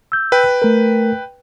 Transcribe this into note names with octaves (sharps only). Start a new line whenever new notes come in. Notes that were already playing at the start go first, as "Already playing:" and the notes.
E6 G6
B4 G5
A3 A#4